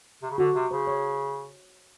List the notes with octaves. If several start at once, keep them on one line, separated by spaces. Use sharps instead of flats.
C3
C#3
D3 F#4
C3
C#3 C5
C#5